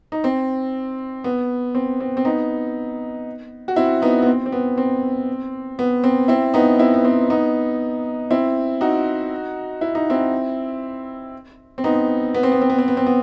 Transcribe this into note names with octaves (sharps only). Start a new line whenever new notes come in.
D#4
C4
B3
C4
C4
C4
B3 D#4
F#4
C4 E4
B3 D#4
B3
C4
C4
B3
C4
B3
C4
C4 E4
B3 D#4
C4 E4
B3
C4
B3 D#4
C4 E4
D#4 F#4
E4
D#4
C4 E4
C4
B3 D#4
B3
C4
B3
C4
B3
C4
B3
C4
B3